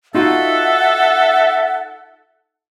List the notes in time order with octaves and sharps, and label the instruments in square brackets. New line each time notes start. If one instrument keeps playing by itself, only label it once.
[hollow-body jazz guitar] D#4 F4 F#4 [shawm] A4 [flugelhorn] E5 [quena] F#5